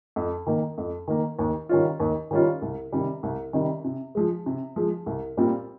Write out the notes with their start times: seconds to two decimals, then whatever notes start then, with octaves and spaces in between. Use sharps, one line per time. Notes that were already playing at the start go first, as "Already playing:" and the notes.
0.16 F2
0.47 D#3 A#3
0.78 F2
1.08 D#3 A#3
1.39 D#2
1.69 D#3 G3 C#4 F4
2.00 D#2
2.31 D#3 G3 C#4 F4
2.62 C2
2.92 C3 D#3 G3
3.23 C2
3.53 C3 D#3 G3
3.84 C3
4.15 F3 G#3
4.46 C3
4.76 F3 G#3
5.06 C2
5.37 A#2 G3 C4 F4